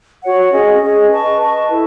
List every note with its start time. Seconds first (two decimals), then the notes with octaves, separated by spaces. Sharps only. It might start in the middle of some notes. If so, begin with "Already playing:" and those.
0.22 F#4 C#5 F#5
0.51 C#4 G#4 D#5
0.81 C#4 G#4 D#5
1.11 B4 D#5 A5 C#6
1.41 B4 D#5 A5 C#6
1.70 E4 A4